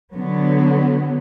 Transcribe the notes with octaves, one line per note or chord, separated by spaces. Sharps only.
D3 F#3 B3